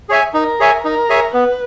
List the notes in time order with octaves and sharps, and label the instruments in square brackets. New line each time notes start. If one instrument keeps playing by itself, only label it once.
[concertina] G#4 C#5 E5 G#5
[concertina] D#4 [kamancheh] A#4
[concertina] G#4 C#5 E5 G#5
[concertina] D#4 [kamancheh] A#4
[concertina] G#4 C#5 E5 G#5
[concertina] B3 [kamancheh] B4